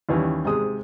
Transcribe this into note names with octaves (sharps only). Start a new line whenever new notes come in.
D#2 E3 G3 C#4
G#2 C3 G#3 D#6